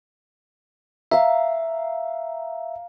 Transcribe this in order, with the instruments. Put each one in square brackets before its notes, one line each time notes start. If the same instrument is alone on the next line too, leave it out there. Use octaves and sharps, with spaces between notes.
[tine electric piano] E5 [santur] F5 A#5